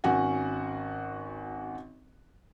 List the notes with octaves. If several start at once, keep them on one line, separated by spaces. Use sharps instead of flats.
G#1 C#4 F#4 F#5 G#5